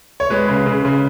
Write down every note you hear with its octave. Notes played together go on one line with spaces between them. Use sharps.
C#5
G#3 B4
C#3
C#3
C#3